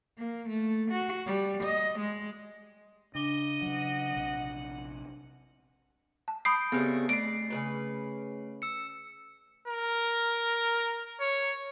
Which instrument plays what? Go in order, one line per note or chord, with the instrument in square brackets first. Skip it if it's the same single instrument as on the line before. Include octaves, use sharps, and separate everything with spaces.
[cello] A#3
A3
F#4
G3
D#5
G#3
[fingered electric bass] C#3 [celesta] D4 D6 G7 [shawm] D#5
[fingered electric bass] C#3 F#3 [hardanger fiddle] F#5
[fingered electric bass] A#1 C3
[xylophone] A5
[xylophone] B5 D#6 C7 [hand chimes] G6 D7
[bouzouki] C#3 G3 A3 [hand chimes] B3 C4
[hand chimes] A3 C7 [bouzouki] D5 [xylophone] D7
[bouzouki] C#3 E3 B4
[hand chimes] E6 C#7
[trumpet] A#4
C#5